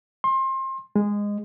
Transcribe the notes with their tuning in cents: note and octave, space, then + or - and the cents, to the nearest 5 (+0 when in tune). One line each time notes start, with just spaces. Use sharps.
C6 +30
G#3 -15